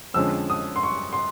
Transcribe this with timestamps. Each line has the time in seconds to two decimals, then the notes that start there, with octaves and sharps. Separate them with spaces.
0.14 F2 D3 F3 G#3 C#4 E6
0.50 D#6
0.76 C6
0.83 C#6
1.13 C6